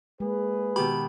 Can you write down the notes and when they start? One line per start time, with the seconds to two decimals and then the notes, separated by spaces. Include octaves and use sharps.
0.20 G#3 A#3 G#4 B4
0.76 B2 D#3 G4 B5